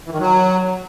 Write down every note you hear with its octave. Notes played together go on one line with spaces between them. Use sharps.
E3
D#3
F#3